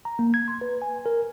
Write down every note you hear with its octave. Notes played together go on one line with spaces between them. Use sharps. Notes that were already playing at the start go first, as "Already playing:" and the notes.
A#5
A#3
G#6
C6
B4
G#5
A#4